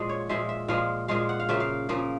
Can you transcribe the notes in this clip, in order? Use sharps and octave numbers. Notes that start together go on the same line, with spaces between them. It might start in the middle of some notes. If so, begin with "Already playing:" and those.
Already playing: A#2 F3 G#3
C#5
A#2 F3 G#3 E5
E5
A#2 F3 G#3 F5
A#2 F3 G#3 F5
F#5
F5
C#3 F3 A#3 E5
F5
C#3 F3 A#3